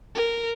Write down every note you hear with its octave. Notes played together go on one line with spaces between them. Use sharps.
A#4